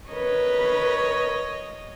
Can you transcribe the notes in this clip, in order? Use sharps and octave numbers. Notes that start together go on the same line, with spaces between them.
A#4 B4 C#5 D#5